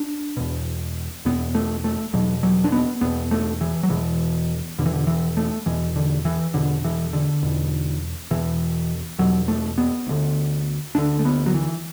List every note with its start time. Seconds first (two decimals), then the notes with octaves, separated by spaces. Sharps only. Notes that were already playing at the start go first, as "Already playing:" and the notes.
Already playing: D4
0.37 E2 B2
1.25 E2 B2 B3
1.55 A3
1.84 A3
2.13 E2 B2 F#3
2.43 F#3
2.64 D4
2.72 B3
3.01 E2 B2 B3
3.31 A3
3.61 E3
3.83 F#3
3.90 E2 B2 E3
4.79 E2 B2 D3
4.86 E3
4.93 D3
5.07 E3
5.37 A3
5.66 E2 B2 E3
5.96 D3
6.25 E3
6.54 E2 B2 D3
6.84 E3
7.13 D3
7.43 E2 B2
8.31 E2 B2 E3
9.19 E2 B2 F#3
9.48 A3
9.78 B3
10.07 D2 D3
10.95 D2 D3 D4
11.19 A3
11.25 B3
11.46 F#3
11.54 E3